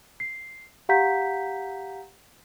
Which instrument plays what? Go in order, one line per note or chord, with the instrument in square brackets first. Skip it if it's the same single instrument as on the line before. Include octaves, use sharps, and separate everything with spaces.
[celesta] C7
G4 F5 F#5 A#5 G6 B6